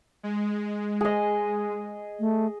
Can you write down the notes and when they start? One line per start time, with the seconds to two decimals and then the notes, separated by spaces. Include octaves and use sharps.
0.23 G#3
1.01 G#4 D#5
2.20 A3